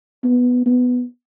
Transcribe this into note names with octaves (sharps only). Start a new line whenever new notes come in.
B3
B3